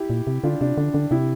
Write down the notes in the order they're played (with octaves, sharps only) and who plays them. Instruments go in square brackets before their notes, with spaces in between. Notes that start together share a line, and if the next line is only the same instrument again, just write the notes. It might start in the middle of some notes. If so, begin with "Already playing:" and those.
Already playing: [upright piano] E4 G4
[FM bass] A#2
C3
[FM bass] D3 [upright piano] D4 F4
[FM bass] C3 [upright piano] D4
[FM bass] D3 [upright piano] D4
[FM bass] D3 [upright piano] D4
[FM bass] C3 [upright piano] E4 G4